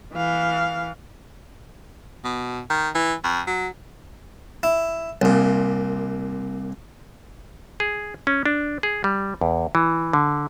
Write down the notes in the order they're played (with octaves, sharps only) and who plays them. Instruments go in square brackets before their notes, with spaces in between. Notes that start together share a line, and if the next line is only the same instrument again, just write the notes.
[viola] E3 F5
[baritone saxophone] B2
D#3
E3
F2
F#3
[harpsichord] E4
C2 A#2
[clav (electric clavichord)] G#4
C#4
D4
G#4
G3
E2
E3
D3